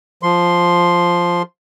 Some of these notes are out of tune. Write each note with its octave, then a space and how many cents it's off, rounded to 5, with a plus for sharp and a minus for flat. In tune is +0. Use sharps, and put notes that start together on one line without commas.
F3 +0 C6 +0